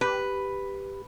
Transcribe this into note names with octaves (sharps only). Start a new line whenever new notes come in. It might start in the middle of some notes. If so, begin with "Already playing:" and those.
G4 B4